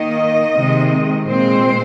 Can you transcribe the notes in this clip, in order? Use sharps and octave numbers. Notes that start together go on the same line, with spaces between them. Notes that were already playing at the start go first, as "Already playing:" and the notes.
Already playing: D#3 A#3 D#5
C3 D#3 G#3 C4
A#2 G#3 C4 C5